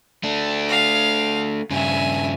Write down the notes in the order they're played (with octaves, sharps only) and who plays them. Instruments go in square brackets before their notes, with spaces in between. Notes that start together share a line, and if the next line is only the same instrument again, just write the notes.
[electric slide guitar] A3 D4
[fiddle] F5
[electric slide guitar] G2 C#3 [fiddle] E5 G#5